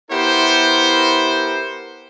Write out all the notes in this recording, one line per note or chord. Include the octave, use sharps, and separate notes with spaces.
B3 E4 G4 A#4 C5